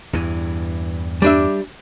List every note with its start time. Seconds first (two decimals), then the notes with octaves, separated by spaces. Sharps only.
0.13 E2 G2 E3
1.22 G3 D4 E5